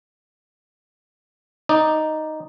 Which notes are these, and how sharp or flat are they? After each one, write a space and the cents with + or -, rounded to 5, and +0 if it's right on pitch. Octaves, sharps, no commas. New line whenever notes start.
D#4 +0 D5 +10